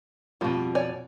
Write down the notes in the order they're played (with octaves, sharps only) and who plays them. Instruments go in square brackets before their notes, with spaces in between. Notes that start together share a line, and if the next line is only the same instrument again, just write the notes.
[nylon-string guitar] F2 B2 [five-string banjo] G3 F4
[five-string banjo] C#5 D5 G#5